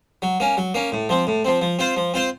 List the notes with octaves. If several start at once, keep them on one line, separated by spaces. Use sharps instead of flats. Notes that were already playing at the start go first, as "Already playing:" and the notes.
F#3
A#3 C#4
F#3
A#3 C#4
A2
F3 C4
A2
F3 C4
F3
C4 F4 C5
F3
C4 F4 C5